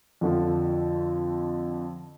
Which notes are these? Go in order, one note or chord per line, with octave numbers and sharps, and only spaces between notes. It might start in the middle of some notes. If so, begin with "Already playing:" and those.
F2 D3 F3